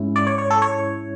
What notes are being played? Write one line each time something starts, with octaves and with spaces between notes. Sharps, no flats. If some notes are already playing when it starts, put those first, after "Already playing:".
Already playing: G#2 G#3 C#4 E4
D5
C#5
C#5
A4
C#5